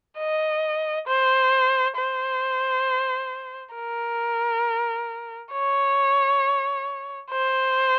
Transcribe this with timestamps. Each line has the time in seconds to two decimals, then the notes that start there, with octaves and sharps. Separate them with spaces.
0.18 D#5
1.07 C5
1.97 C5
3.75 A#4
5.53 C#5
7.31 C5